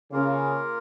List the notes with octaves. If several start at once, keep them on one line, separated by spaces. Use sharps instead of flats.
C#3 A#3 F4 A#4